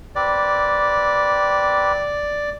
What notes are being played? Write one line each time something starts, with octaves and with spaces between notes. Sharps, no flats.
C4 G4 B4 D5